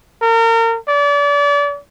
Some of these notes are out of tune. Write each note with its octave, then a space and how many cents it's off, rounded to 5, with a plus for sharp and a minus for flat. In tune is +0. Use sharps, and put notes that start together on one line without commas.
A#4 -35
D5 -35